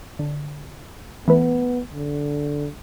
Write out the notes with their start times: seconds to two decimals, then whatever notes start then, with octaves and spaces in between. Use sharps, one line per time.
0.19 D3
1.28 E3 A3 B3 B4
1.93 D3